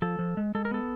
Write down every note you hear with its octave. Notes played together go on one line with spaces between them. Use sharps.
F3 A4
F3
G#3
G#3 A4
A#4
B3 A4